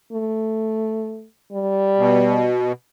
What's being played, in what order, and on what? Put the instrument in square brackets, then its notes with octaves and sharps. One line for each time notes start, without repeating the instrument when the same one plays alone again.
[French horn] A3
G3
[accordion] B2